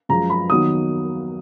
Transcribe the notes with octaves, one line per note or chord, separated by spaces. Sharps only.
F#2 F3 G#3 A#5
B5
D#2 D#3 F#3 B3 D#4 D#6